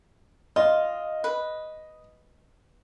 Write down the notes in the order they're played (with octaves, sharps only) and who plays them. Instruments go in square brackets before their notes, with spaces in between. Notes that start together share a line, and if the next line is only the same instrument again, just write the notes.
[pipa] F4 [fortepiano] D#5
[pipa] B4